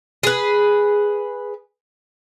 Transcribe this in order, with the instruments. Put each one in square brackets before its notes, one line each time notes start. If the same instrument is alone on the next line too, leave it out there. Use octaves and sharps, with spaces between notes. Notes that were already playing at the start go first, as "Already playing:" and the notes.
[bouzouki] G#4 B4